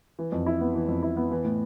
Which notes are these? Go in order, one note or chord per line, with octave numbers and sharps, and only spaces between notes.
E3
F2
E4
B3
E3
F2
E4
B3
E3
A2